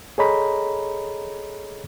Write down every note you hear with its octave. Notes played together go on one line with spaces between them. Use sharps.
G#4 A4 C#5 D#5 A#5 B5